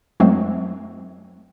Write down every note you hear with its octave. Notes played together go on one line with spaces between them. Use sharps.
F#2 F#3 G#3 A3 C4